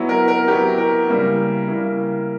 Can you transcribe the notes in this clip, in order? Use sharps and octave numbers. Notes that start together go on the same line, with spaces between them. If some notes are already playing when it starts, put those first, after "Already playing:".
Already playing: F#3 B3 E4
A#4
A#4
F#3 B3 E4 G4
A#4
C#3 G3 A#3 E4
C#3 G3 A#3 E4